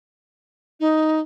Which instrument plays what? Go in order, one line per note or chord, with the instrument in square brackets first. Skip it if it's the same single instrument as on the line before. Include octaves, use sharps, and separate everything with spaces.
[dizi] D#4